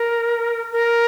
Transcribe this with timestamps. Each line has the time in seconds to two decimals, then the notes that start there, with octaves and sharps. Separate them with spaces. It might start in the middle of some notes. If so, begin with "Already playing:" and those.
Already playing: A#4
0.72 A#4